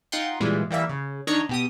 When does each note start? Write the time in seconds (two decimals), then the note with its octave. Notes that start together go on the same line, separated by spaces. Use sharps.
0.12 D#4 F4 F#5 G5 C6
0.40 A#2 E3 G3 G#3
0.70 E3 G3 A#3 E5
0.89 C#3
1.27 D#3 D4 C#5 D#5 A#5 C#7
1.49 B2 G4 D#6